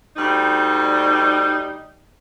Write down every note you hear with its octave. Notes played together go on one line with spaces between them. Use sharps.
D2 G3 D#4